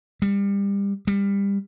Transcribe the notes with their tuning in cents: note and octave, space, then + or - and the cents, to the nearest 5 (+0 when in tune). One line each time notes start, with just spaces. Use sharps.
G3 +30
G3 +25